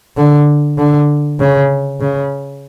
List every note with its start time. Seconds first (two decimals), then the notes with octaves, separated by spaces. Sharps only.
0.17 D3
0.78 D3
1.39 C#3
2.00 C#3